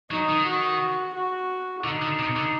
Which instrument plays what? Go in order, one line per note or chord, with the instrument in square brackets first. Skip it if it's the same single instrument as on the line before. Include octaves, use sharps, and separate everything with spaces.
[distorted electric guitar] F#3 [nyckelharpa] D#4
[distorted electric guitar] D#3
[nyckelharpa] F#4
F#4
[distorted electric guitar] D3 [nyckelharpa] D#4
[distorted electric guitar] D3
C3
D3